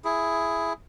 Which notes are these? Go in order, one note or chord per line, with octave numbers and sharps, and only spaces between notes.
E4 G#4